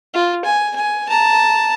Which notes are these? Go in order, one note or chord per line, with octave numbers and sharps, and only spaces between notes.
F4
G#5
G#5
A5 A#5